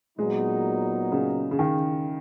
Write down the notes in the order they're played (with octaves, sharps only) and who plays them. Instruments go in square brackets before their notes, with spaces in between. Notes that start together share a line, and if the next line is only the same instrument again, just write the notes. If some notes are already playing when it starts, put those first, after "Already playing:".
[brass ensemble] A#2 F#3 B3 D#4 [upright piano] G#3
[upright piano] C#3
C#3
D#3